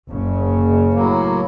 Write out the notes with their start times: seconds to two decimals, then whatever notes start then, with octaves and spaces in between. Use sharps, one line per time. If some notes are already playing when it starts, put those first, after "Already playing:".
0.10 F#1 C#3
0.94 A2 F#3 A#3